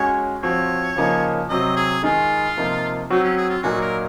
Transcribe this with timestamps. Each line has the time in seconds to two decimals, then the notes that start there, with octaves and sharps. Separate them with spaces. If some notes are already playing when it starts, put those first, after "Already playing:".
Already playing: G#3 C#4 F#4 C#5
0.43 F3 C4 F#4 C#5
0.96 C#3 F3 A#3 D#4
1.49 C3 F#3 C4 D#5
1.76 G#4
2.03 D#3 G#3 D#4 F4 G#4
2.57 C3 F3 A#3 D#4
3.10 F#3 C4 D#4 F#4
3.23 C#4
3.37 G#4
3.50 F4
3.63 A#2 F#3 A#3 D#4 F#4
3.81 A#4